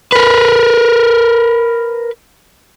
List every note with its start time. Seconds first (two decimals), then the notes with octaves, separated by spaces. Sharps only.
0.12 A#4 B4